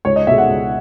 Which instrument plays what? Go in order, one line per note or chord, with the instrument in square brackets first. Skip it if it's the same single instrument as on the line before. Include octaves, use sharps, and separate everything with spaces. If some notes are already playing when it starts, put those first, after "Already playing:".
[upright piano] C#2 C#5
D#5
B2 G#3 E5
F#5
C#2